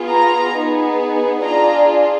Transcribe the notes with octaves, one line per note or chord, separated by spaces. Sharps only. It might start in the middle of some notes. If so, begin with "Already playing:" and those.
Already playing: B3 F4 G#4
A#5
B3 D#4 G#4
D4 F4 G#4 A#5